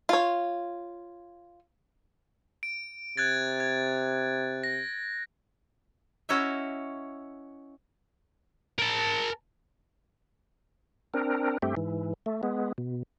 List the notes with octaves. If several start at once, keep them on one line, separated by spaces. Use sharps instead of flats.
F4 C#5
D7
C3 F#6 G#6 A6
G#6
A#6
C#4 E4 F#4 C#5 D#5 E5
A#4 A5
C4 D4 A#4
G2 A3 C4 G4
G#2 E3
A3
G#3 B3
B2